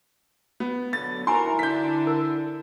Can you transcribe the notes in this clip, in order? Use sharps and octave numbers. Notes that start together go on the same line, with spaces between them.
B3
B2 D3 F#3 A6
D#4 E4 F#4 A#4 G#5 A#5 C6
D3 D4 G6 B6
A#4